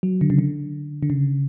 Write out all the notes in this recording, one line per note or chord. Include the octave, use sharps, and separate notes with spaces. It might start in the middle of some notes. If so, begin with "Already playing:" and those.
F#3
D3
C#3
D3
D3
C#3